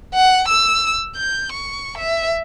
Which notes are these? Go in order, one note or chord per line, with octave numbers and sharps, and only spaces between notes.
F#5
E6
G6
C#6
E5